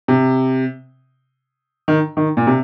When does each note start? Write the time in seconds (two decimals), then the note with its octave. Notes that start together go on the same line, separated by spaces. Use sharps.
0.08 C3
1.88 D#3
2.17 D#3
2.37 A#2
2.47 C3